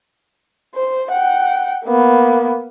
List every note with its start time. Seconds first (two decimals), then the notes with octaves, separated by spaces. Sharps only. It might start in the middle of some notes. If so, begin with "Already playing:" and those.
0.75 C5
1.11 F#5 G5
1.85 A#3 B3